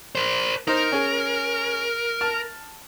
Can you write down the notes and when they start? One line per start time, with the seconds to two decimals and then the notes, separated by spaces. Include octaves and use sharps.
0.15 A#4 C5
0.67 D#4 A#4 C5
0.92 C#4 G#4
2.21 A5 F6